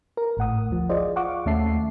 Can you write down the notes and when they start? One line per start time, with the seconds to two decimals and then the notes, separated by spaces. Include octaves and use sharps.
0.17 A#4
0.37 G#1 A2 F#5 D#6
0.69 D2 F3
0.89 F4 G#4 C5 D5 D#5
1.16 F5 F#5 C#6 D6
1.46 D#2 A3 C#4 E5 A5 C7